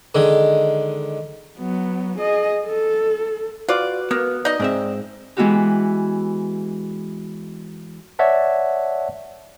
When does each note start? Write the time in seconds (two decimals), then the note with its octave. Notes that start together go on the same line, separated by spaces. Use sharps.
0.15 D3 D#3 G#3
1.59 F#3 B3
2.18 G#4 D#5
2.66 A4
3.69 F4 F#4 B4 D5 F#6
4.11 A#3 B3
4.45 D#4 D5 D#5
4.60 G#2 C4 E5
5.37 E3 G#3 B3 E4 F#4 G4
8.19 C#5 D5 E5 F#5 A5